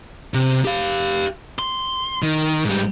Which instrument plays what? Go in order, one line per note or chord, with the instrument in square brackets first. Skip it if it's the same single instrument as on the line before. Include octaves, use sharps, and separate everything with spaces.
[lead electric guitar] C3
G4 F5
C6
D#3
G#2 G3